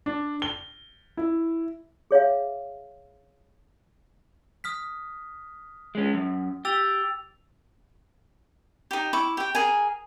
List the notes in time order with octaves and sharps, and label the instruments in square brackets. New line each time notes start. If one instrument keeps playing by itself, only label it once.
[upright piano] D4
G7
E4
[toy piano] G#4 C#5 E5 F5
[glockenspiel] D#6 F6 B6
[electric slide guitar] G#3 C#4
F#2
[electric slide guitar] G4 [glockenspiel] E6 A6 F7
[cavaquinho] D#4 G4
E4 C#6 D6
G4 G5
G#4 A#4 G#5